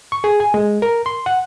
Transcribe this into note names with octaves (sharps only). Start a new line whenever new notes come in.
C#6
G#4
G#5
G#3
A#4
C6
F#5